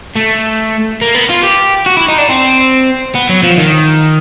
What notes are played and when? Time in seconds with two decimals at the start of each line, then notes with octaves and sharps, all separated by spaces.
0.16 A3
1.02 A#3
1.15 B3
1.30 F4
1.44 G4
1.86 F#4
1.97 E4
2.09 D#4
2.18 D4
2.29 C4
3.15 B3
3.29 F#3
3.43 F3
3.58 D#3